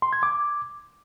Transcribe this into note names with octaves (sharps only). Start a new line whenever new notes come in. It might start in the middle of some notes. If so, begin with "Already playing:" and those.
C6
G#6
D6